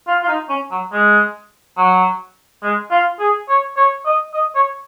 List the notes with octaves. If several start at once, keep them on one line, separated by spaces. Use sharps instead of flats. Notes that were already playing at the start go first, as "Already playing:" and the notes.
F4
F4
D#4
C#4
F#3
G#3
F#3
G#3
F4
G#4
C#5
C#5
D#5
D#5
C#5